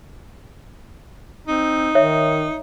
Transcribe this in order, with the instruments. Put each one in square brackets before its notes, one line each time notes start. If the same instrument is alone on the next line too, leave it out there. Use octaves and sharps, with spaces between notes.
[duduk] C4 [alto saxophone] D#4
[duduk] D#3 [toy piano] C#5 E5